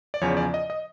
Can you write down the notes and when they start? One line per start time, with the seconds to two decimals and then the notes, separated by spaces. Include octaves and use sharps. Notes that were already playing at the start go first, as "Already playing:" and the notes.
0.14 D5
0.21 E2 C#3 F3 C#5
0.37 D5
0.54 D#5
0.70 D#5